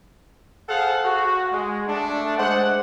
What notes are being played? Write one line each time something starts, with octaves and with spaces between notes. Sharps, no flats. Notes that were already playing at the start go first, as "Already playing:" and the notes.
G#4 A4 C5 F5 F#5
F#4
G#3
A3 D4
G#3 C5 F#5